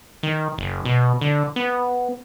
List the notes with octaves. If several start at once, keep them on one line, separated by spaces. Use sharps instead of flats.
D#3
F#1
B2
D3
B3